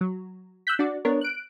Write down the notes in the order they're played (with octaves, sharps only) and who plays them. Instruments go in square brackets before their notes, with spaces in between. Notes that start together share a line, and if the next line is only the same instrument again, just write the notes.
[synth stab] F#3
E6 F#6 G6 B6
D4 F#4 D5
B3 D4 A#4 C#5
F#6 D7